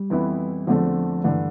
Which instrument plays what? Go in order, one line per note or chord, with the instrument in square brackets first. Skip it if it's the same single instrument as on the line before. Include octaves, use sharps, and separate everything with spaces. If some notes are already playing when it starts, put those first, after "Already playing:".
Already playing: [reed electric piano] G3
[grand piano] F2 E3 B3 E4
[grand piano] E2 D3 A3 C4 [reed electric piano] F3
[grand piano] G2 D3 A3 [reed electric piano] E3